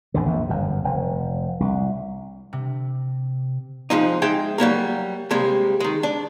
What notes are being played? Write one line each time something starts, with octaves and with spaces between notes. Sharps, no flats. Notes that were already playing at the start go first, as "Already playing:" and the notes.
A1 E2 D3
A#1 F2
G1 F#2
F1
C2
C3
F2 G#2 F3 D#4
G#3 D#4 G#4 E5 G5
F#3 G3 A#3 A#4
C3 G3 G#3 A#3
D#3 G#3
D4